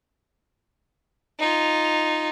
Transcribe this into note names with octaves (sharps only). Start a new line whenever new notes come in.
D#4 F4